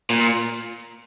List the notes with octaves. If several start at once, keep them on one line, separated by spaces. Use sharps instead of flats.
A#2